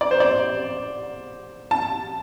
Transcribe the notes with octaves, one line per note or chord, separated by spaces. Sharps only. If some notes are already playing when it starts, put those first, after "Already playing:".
D5
C5
D5
A5